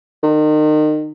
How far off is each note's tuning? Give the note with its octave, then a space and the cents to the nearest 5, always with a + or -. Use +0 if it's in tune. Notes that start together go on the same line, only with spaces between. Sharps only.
D#3 -30